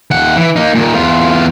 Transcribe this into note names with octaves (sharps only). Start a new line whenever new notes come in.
D#2 F#5
E3
A#3 D#4
A#2 D#3
E2 F4